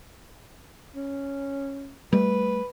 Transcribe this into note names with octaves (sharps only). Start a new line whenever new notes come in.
C#4
G3 A3 B4